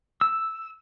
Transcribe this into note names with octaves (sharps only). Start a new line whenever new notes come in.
E6